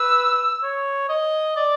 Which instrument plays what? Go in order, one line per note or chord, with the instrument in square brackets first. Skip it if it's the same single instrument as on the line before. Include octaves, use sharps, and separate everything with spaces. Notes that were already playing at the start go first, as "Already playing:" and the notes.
Already playing: [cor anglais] B4 [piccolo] E6
[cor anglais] C#5
D#5
D5